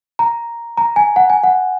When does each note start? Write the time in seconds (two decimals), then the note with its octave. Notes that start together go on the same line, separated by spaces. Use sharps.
0.19 A#5
0.77 A#5
0.96 G#5
1.16 F#5
1.30 G#5
1.43 F#5